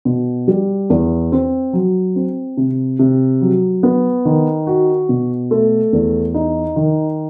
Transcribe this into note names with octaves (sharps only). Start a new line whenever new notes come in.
B2
G3
E2
C4
F#3
C4
C3
C3
F#3
B3
D#3
F#4
B2
A3
E2
D#4
D#3